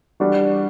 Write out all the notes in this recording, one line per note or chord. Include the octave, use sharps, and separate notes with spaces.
E3 G3 D4 F#4